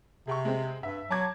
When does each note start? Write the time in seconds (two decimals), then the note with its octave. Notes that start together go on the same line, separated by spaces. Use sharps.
0.27 C3 G#4 G5 C#6
0.45 G#3 C4
0.83 G2 E5
1.11 F#3 A5 D6 G#6